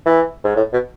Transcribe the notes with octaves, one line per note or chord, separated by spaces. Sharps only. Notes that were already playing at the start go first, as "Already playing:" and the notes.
E3
G#2
A2
B2